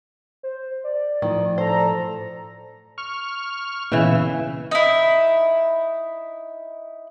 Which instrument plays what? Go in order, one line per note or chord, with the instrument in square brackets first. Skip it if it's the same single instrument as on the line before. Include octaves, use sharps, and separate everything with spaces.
[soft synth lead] C5
D5
[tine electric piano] A2 F3 [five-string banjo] D#3
[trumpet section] A4 A#5 [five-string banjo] C5
[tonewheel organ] C#6 F6
[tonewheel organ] A#2 B3 E5 [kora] C#3 E3
[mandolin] D#4 E4